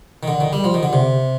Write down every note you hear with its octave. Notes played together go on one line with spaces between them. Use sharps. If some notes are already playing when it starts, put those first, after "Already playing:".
D#3
D3
D#3
G3
F3
D#3
D3
C3